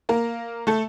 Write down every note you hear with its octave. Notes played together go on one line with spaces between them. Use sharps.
A#3 A#4
A3 A4